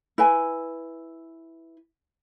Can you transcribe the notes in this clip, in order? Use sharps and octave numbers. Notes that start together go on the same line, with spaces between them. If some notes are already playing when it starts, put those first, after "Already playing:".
E4 B4 G#5